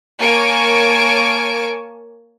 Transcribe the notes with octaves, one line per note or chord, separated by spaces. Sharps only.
A#3 C#5 G#5 A5 C#6 D7